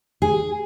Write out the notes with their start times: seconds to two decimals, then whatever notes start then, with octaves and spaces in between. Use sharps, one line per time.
0.22 G#4